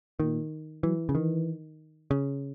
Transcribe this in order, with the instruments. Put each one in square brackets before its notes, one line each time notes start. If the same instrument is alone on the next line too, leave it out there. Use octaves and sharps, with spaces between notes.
[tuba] A#2 [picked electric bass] D#3
[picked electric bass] E3 [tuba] F#3
[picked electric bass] C#3
[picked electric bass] D#3 [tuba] E3
[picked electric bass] C#3